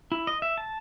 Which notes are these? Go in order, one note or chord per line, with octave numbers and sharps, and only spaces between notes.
E4
D#5
E5
A5